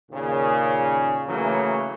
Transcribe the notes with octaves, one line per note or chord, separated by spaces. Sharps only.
D#2 A#2 C#3
C#3 E3 F#3 A3 A#3